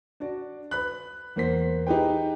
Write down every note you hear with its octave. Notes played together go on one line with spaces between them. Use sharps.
D4 F#4 D5
B4 B5 F#6
E2 A#3 C5 B6
D#4 G4 G#4 B4 G5